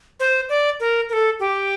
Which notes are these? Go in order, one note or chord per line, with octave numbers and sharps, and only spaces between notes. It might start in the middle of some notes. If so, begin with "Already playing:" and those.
C5
D5
A#4
A#4
A4
G4